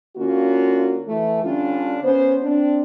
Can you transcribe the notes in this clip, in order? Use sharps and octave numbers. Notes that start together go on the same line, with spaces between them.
D3 A#3 C#4 F4 F#4
E3 A3
D3 G3 C#4 D4 F4
B3 C#4 C5
C4 D4